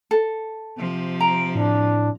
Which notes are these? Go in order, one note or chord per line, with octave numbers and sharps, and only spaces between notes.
A4
C3 F3
A#5 D7
A2 D4